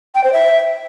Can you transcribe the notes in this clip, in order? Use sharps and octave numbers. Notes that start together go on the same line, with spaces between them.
G5
C5
E5